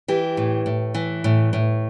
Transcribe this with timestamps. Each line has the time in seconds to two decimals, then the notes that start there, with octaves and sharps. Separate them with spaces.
0.08 E3 G4
0.37 A2
0.66 A2
0.94 E3
1.24 A2
1.53 A2